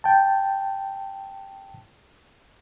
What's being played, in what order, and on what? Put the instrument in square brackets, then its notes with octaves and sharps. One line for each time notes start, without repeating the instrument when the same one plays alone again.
[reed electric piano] G5 A5